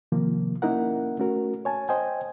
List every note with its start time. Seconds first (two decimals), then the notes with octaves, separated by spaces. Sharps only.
0.12 C3 D#3 F3 A#3
0.62 A#3 C#4 D#4 E4 A#4 F#5
1.19 A3 C#4 F#4 A#4
1.65 C#5 G#5 A5
1.89 C5 D#5 G5 G#5